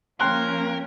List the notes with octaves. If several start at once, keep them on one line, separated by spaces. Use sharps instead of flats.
F3 A#3 C#4 A#4 G5 C6 F#6